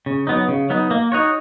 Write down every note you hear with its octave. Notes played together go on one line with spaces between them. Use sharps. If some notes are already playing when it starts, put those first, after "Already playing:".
C#3
F#3 B3 D#4
C#3
F#3 B3 D#4
A#3
D#4 F#4 C#5